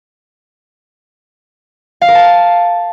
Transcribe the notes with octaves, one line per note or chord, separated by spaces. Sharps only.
F5
A#4
A5